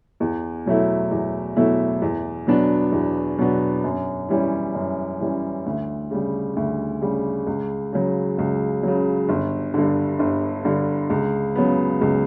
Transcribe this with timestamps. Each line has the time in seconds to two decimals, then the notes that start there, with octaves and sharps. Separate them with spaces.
0.20 E2
0.66 B2 F#3 A3 E4
1.11 E2
1.56 B2 F#3 A3 E4
2.02 E2
2.47 B2 F#3 B3 D4
2.92 E2
3.38 B2 F#3 B3 D4
3.84 F#2
4.29 E3 G3 C#4
4.75 F#2
5.20 E3 G3 C#4
5.66 D2
6.11 C#3 G3
6.56 D2
7.02 C#3 G3
7.46 C#2
7.93 C#3 F#3
8.38 C#2
8.83 C#3 F#3
9.29 G1
9.74 G2 D3
10.19 G1
10.65 G2 D3
11.10 C#2
11.56 C#3 F#3 B3
12.01 C#2